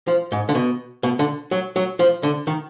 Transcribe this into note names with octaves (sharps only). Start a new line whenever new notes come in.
F3
G#2
D3
B2
B2
D3
F#3
F#3
F3
D3
D#3